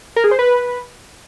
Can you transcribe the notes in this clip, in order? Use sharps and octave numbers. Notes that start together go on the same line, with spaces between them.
A#4
G#4
C5
B4